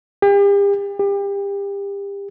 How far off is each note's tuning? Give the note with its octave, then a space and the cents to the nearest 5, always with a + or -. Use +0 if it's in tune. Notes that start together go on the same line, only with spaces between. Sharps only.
G4 +40
G4 +30